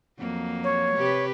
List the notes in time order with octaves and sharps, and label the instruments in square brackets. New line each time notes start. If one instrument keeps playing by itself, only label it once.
[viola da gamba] F2 F#3 A#3
[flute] C#5
[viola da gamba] C3 G4 B4